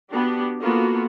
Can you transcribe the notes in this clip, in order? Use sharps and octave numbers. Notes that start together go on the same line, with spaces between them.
B3 D4 F#4 G4
A#3 B3 F4 F#4 A4